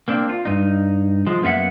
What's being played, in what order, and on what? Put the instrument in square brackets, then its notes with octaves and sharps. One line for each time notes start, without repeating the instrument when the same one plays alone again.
[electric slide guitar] A#3 C4 D4
F4
G2 D#4
F3 G#3
F#2 A#3 B3 F4 E5 F#5